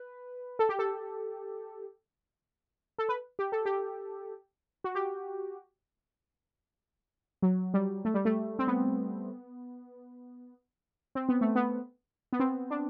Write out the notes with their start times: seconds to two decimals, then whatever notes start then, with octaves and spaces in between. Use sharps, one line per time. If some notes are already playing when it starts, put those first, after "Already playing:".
Already playing: B4
0.59 A4
0.69 G4
0.79 A4
2.98 A4
3.09 B4
3.39 G4
3.52 A4
3.65 G4
4.84 F#4
4.95 G4
7.42 F#3
7.74 G3
8.05 A3
8.14 G3
8.25 A3
8.59 C4
8.67 B3
11.15 C4
11.29 B3
11.41 A3
11.56 B3
12.33 B3
12.40 C4
12.71 D4